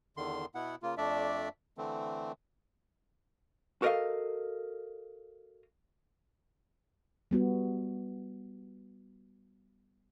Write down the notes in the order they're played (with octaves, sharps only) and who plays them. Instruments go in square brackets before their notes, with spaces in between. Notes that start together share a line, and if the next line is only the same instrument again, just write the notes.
[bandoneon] E2 D3 D#3 C6
B2 B3 E4 F#5
C#3 A#3 F4
F2 A3 D4 D5 E5
D3 E3 A3 C4
[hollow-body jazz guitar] F#4 A4 A#4 D5 D#5 F5
[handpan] G3 B3 F#4